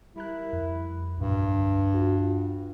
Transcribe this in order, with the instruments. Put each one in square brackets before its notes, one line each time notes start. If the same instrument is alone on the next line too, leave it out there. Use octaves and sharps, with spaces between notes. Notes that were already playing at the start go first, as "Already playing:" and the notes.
[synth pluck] G3 A#4 F#6 [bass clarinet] E4
[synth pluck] F2
[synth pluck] B1 A#2 F#3 [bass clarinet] G2
[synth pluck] D2
F4 F#4